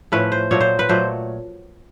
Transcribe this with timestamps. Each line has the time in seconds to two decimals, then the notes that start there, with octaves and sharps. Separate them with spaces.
0.12 A2 F3 A3 C#4 B4
0.32 C5
0.51 A#2 F#3 A3 C#5
0.61 C5
0.79 B4
0.89 A#2 F#3 A3 C5